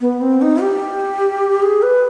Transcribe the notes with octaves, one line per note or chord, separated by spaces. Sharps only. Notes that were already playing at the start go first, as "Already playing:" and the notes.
B3
C4
D#4
G4
G#4
B4